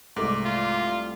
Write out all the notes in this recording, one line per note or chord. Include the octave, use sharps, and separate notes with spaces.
C2 G#2 A3 D6
F4